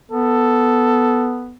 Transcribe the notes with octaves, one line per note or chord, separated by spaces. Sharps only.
B3 A4